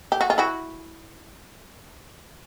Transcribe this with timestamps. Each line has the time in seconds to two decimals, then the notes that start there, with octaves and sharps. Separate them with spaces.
0.12 G4
0.21 F#4
0.30 F4
0.38 E4 F#4